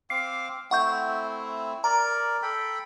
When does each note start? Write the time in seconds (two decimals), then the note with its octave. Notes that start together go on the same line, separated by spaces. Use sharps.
0.10 C4 F5 D6 C7
0.71 A3 C4 E4 F#5 C#6 G6
1.84 A#4 D5 A#5
2.42 A4 G5 B5